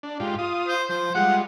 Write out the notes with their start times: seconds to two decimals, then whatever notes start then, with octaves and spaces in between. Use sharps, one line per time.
0.03 D4
0.20 G#2 F4 G4
0.39 F4 D#6
0.68 C5
0.89 F3 C5
1.15 G3 G#3 F4 F#5